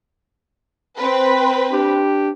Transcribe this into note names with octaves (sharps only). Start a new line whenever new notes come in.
C4 B4
D4 G4